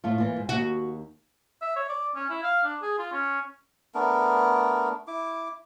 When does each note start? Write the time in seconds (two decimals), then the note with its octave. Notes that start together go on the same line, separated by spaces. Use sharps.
0.04 A2 A3 F4
0.18 A#2 E3 F4
0.36 G#2
0.49 D#2 D#4 F#4
1.62 E5
1.76 C#5
1.89 D5
2.15 C#4
2.30 E4
2.43 F5
2.64 D4
2.82 G#4
2.99 F4
3.12 C#4
3.94 A3 B3 D4 A#4
5.07 E4 D6